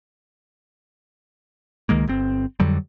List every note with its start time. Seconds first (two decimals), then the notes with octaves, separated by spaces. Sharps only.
1.89 C#2 D#3 G#3 A#3
2.08 G1 C4
2.60 F2 D3 F#3 G3